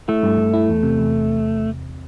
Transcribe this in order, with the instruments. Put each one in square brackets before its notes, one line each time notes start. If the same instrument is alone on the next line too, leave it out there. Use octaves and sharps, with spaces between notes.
[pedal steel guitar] A3 [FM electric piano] E4
[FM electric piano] G2
G2
E4
E2
C3
E2